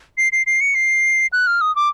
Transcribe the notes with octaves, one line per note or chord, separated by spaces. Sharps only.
C7
C7
C7
C#7
C7
F#6
F6
D#6
D6